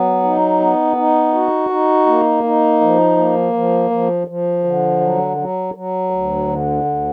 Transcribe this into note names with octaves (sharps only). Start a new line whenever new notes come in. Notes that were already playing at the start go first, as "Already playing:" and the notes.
Already playing: F#3 B3
D#4
B3
D#4
F#4
D#4
A#3
D#4
F3
A#3
F3
F3
F3
D3
F#3
F#3
F#3
D2
D3
D2